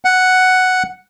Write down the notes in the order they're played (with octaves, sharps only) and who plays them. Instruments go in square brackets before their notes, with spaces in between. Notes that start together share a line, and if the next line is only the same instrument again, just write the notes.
[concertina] F#5